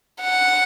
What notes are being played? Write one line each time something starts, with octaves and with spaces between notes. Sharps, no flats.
F#5